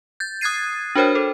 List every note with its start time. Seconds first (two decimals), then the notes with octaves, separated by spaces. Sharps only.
0.20 G6 A6
0.41 D#6 F#6 G#6 A6 C7 D#7
0.95 D4 F#4 A#4 C5 C#5 G5
1.15 A4 C5